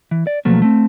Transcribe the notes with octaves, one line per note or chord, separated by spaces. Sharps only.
E3
D5
B2 F3 F#3 A3 A#3
A3 C4